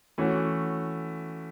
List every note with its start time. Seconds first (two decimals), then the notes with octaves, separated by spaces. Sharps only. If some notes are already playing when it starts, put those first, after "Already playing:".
0.18 E3 A3 C#4 F#4